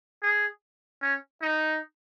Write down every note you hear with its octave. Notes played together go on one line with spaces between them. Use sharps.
G#4
C#4
D#4